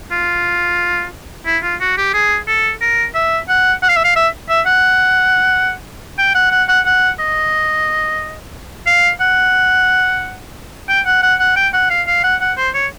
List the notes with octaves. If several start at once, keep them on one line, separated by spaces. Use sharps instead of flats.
F4
E4
F4
F#4
G4
G#4
A4
A#4
E5
F#5
F#5
F5
E5
F5
E5
E5
F#5
G5
F#5
F#5
F#5
F#5
D#5
F5
F#5
G5
F#5
F#5
F#5
G5
F#5
F5
F5
F#5
F#5
C5
C#5